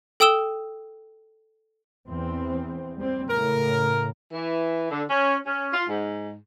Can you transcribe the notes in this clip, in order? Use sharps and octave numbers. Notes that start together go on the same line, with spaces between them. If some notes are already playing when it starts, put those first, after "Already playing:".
A4 G5 D#6 E6 E7 G7
E2 C4
G3 C4
A2 C#3 A#4
E3
D3
C#4
C#4
F4
G#2